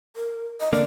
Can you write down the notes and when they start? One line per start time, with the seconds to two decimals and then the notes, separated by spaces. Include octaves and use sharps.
0.16 A#4
0.60 D#5
0.73 D3 A#3 D5